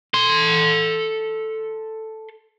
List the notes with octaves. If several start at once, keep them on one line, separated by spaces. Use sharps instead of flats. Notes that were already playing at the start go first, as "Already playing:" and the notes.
A4 C6